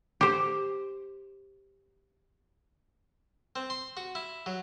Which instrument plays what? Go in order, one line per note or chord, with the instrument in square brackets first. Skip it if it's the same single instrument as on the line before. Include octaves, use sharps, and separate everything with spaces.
[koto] G4 C5
[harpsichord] C4
C6
F#4
E4
F#3